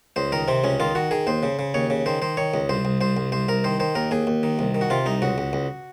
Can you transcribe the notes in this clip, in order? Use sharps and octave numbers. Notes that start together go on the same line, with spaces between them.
C#2 C5
D#3 A#4
C3 C4
C#2 C#4
D#3 F4
D#3 F#4
D#3 G#4
D#2 C5
C#3
C#3
D#2 C#5
C#3
D#3 C5
D#3 C5
D#3 C#5
C#2
C2 C5
C2
C2 C5
C2
C2 C5
C2 A#4
D#3 C5
D#3 C5
D#2 A#4
D#2 G#4
D#2
D#3
C2
D#3
F#4
C3 F4
C2 D#4
C#2 F#4
C#2
C#2